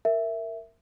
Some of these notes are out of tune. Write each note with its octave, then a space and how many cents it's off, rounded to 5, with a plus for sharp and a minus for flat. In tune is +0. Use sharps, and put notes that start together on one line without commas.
A#4 -15 E5 +0